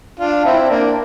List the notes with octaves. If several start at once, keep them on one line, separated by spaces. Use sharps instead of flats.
D4 F4
C4 E4
A#3 D4